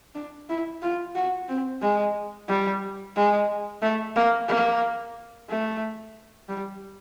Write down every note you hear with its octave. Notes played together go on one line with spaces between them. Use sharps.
D4
E4
F4
F#4
C4
G#3
G3
G#3
A3
A#3
A#3
A3
G3